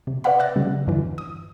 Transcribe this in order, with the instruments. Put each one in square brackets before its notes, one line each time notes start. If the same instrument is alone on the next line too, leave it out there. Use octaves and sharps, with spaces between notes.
[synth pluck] C3
B4 D5 F5 F#5 B5
D5 E5 F#6 A6 A#6
C#3 F#3 G3
E2 G2 D3 E3
D#6